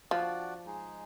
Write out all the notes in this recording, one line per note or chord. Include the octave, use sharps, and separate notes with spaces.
F3 D4 F#4 D5 F#5
G#3 D#4 G#4